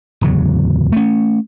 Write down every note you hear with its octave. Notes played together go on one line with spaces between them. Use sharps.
D1 E2 C#3 F#3
A3 C#4